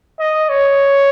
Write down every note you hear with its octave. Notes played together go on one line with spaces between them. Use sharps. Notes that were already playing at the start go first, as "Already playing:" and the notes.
D#5
C#5